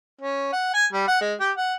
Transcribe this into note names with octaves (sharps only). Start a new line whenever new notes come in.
C#4
F#5
G#5
G3
F#5
G#3
G4
F#5